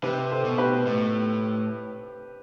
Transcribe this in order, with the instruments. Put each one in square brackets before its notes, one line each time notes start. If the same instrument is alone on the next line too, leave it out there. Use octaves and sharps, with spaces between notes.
[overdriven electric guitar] C3 [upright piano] G4 B4
[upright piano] A4 C5
[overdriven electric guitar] B2
[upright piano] G4 B4
[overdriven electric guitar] A2